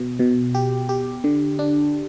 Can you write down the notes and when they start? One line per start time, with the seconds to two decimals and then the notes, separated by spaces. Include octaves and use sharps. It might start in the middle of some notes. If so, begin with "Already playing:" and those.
Already playing: B2
0.19 B2
0.55 G4
0.89 G4
1.24 D3
1.59 D4